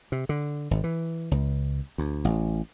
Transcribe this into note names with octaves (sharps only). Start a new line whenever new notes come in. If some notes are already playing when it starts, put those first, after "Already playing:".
C3
D3
G#1
E3
C#2
D2
A1